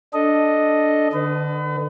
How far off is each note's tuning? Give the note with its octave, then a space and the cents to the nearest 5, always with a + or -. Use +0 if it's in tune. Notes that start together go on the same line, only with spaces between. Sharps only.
D4 +0 A4 +0 D#5 +0
D3 +30 B4 +40